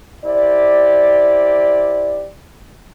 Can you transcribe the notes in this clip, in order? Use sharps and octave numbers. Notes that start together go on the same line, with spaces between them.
E4 G4 C5 D5